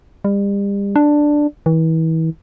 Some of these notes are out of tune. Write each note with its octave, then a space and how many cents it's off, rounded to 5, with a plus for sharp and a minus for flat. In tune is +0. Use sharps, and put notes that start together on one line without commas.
G3 +35
D4 +5
E3 -35